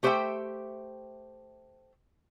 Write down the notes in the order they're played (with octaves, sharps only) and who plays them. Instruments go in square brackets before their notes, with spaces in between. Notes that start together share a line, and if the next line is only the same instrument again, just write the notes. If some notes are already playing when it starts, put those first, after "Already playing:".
[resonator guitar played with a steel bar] A3 G4 C5 C#5 E5 G5